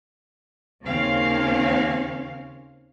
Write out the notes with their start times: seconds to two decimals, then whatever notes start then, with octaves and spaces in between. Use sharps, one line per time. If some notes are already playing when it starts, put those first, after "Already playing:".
0.84 D#2 C#3 A#3 C4 C#4 F5